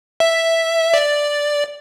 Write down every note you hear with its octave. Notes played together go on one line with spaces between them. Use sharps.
E5
D5